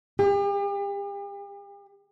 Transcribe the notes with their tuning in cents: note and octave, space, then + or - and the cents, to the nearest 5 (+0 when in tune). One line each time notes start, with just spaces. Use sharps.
G4 +40